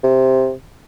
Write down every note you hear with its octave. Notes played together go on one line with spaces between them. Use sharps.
C3